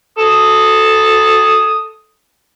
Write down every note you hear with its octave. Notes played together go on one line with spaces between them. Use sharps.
A4 D#6